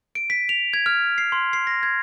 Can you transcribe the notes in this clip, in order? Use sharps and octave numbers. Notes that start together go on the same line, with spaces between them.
D7
B6
F7
G#6
F6
C7
C6
C7
A#6
G#6